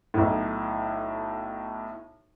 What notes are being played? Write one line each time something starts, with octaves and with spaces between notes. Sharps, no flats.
B1 A2